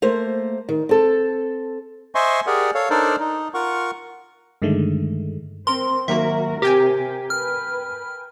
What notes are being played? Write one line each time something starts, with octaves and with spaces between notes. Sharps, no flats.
A3 A#3 C5
D#3
C4 A4
C5 D#5 E5 G#5 C6 C#6
G4 G#4 A#4 D5 F#5
A4 C#5 F5
D4 D#4 A4 A#4 C5 D5
D#4
F4 A#4 F#5 C#6
G2 D3 D#3 G#3 A3
C4 A#4 C6
D#3 F#3 A#3 F#4 A#4 E5
C3 G4 A#4 G5 G#5
B4 F6